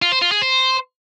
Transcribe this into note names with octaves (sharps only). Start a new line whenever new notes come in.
F4
C5
F4
G#4
C5